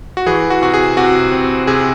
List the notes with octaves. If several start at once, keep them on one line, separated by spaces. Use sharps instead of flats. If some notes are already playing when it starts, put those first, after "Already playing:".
F#4
E3 G#4
F#4
C3 F#4
G#4
C3 F#4
C4
C3 G#4